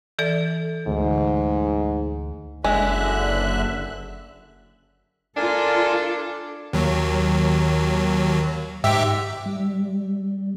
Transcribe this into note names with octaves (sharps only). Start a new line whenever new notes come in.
E3 A4 D5
D2 G#2
F#1 D3 G#3 E5 F#6
D4 F4 A4 A#4 D5 G#5
D#2 F#3
G#2 G4 E5
G3